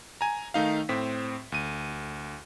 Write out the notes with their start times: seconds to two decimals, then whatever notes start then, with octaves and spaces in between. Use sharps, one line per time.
0.21 G#5 A#5
0.54 D#3 A3 D#4 F5
0.89 A2 C4 B6
1.52 D2 D#7